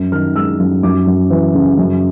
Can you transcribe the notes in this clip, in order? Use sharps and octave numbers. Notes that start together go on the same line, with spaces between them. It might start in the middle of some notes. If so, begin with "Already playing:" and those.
Already playing: F#2
D#3 F6
G#3 E6
F#2
F#2 D6
F#2
E3
C#3
F#2